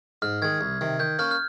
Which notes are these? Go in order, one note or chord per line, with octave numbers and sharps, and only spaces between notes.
G#2 F6
D#3 G#3 G#6
C2
C3 D#3
D#3 G6
A#3 C#4 F6
F6